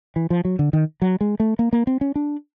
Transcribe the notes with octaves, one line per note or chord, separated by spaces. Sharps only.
E3
F3
F#3
D3
D#3
F#3
G#3
A3
A#3
A#3
C4
C#4
D4